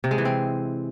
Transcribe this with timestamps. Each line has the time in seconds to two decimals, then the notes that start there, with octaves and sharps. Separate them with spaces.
0.04 C3
0.11 G#3
0.18 E3
0.25 C4